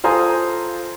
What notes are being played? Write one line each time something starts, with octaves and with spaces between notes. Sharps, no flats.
F4 A4 C5 G#5 A#5 D#6